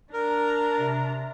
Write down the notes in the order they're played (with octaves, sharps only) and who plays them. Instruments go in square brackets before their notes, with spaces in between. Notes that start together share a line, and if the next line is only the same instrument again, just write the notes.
[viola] D4 A#5 [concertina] A#4
[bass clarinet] C3